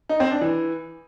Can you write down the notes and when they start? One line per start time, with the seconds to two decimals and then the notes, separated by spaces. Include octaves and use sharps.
0.09 D#4
0.20 C4
0.31 D4
0.41 E3